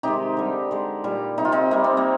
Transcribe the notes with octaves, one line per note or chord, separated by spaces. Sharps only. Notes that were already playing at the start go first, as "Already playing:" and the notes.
C3 D#3 G#3 D#4 G4
D3 G3
D3 G#3
A#2 G3
C3 G3 D#4
F4
C4 D#4
C3 G3 A#3
C4
A#3